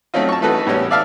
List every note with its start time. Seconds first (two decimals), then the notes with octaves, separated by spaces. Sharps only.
0.14 F#3 A3 C4 C#4 D#4 F4
0.29 A5 C#6
0.42 E3 A3 D#4 F#4 A4 B4
0.67 A2 G3 B3 C#4
0.91 D5 E5 F5 A5 F6